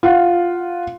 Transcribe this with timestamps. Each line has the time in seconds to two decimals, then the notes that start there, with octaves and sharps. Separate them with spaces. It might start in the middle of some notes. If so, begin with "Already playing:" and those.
0.03 F4 F#5